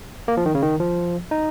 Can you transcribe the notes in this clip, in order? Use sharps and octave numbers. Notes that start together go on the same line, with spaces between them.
A#3
F3
D#3
C#3
D#3
F3
D#4